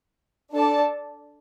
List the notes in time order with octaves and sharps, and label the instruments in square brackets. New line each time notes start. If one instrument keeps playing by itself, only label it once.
[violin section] D4 A4 D5 A5